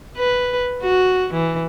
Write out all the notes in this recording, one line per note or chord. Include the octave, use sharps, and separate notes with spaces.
B4
F#4
E3